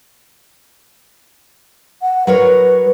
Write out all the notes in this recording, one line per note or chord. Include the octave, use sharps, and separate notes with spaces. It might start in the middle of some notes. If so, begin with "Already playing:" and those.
F#5
F#3 A#4 B4 C#5